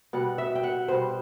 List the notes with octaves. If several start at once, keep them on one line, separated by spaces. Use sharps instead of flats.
B2 G3 F#5
E5
G5
F#5
B2 G3 C5